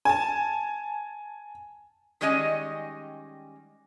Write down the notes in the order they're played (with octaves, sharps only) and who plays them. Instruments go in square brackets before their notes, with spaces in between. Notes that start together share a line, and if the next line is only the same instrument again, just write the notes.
[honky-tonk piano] G#5 A5
[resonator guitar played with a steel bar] D#3 G3 G#3 C#4 D#5 G#5